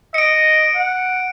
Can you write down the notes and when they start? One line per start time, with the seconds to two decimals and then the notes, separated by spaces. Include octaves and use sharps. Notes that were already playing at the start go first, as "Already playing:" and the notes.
0.14 D#5 C#7 D7
0.75 F#5